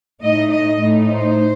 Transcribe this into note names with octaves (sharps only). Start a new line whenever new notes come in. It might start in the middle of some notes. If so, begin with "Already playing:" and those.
A2 A3 D#4 D#5
D#5
A2 A3 D#4
C5